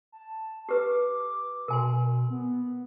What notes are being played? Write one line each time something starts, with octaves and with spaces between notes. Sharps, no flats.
A5
G4 B4 D6
B2 A#4 G#5 C6
B3